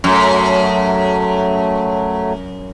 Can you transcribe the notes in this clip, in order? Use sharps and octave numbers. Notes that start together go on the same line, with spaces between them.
F#2 F#3 A3